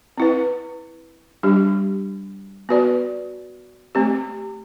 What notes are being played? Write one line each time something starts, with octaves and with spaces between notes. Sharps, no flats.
C4 E4 B4
G3 D4 G4
B3 F#4 B4 D5
A3 C4 G4